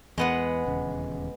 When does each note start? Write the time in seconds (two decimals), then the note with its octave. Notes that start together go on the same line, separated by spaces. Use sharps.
0.18 E2 G#3 B3 F#5
0.67 D#1 E2 C#3